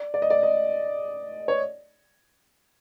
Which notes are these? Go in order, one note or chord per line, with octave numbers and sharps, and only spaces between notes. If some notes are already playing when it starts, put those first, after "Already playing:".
Already playing: D5
D5
D#5
D5
D#5
C#5